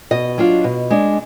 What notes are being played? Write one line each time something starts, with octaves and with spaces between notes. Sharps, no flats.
B2 D#5
F#3 D4 F4
B2
G#3 D4